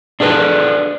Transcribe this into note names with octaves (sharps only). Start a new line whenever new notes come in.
D4 G#4 A4 B4